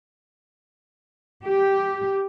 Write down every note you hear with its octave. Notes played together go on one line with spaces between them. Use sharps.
G4